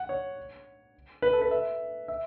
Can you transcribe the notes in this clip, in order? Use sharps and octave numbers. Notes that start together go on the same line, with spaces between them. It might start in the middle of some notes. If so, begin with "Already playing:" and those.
Already playing: F#5
C#5
B4
A4
B4
E5
E5